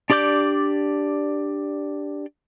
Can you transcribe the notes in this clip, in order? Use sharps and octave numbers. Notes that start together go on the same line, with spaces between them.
D4 G4 D5 D6 G6